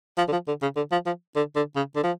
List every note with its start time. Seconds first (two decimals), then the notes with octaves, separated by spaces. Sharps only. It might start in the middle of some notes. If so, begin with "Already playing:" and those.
0.18 F3
0.28 D3
0.32 F3
0.47 D3
0.62 C#3
0.76 D3
0.92 F3
1.06 F3
1.36 D3
1.56 D3
1.76 C#3
1.96 D3
2.03 F3